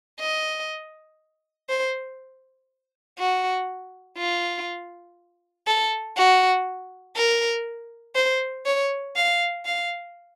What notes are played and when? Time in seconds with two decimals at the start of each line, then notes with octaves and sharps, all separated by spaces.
0.19 D#5
1.69 C5
3.18 F#4
4.18 F4
5.67 A4
6.17 F#4
7.16 A#4
8.15 C5
8.66 C#5
9.16 F5
9.65 F5